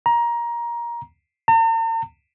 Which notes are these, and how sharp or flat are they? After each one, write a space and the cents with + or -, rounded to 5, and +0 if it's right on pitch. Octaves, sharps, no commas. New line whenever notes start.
A#5 +20
A#5 -45